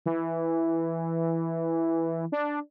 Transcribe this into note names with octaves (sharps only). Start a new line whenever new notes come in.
E3
D4